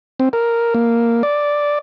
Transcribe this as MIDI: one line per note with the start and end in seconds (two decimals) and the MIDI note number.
0.20 0.29 60
0.33 0.74 70
0.74 1.23 58
1.23 1.79 74